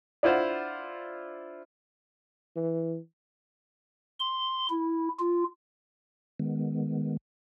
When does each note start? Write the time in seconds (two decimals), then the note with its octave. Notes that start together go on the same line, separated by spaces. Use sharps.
0.23 D4 E4 F4 C5 F#5
2.56 E3
4.20 C6
4.70 E4
5.19 F4
6.39 D#3 G#3 B3